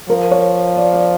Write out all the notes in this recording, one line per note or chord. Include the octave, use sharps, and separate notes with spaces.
F3 A#4
C#5
D5
D5